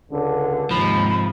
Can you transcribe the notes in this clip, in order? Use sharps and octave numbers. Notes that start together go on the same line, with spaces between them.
C#2 D3
D#2 G#2 C3 F3 B5